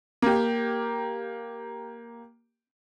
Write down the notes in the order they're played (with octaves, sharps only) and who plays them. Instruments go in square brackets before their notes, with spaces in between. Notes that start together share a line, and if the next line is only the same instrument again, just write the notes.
[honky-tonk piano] A#3 G4